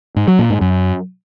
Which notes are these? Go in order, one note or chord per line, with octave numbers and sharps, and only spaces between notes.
G#2
F#3
A#2
G#2
F#2